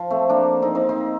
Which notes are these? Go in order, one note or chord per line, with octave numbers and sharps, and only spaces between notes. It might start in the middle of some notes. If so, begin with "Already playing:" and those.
Already playing: F3
A3 C4
A#3 D4
C4 D#4
C4 D#4
C4 D#4